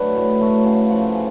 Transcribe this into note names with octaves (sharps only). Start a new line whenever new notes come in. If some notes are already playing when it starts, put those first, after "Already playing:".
Already playing: F#3 A3 D4 B4
A2
F#3 A3
C#3 F5
F3 A3 F#5
C#3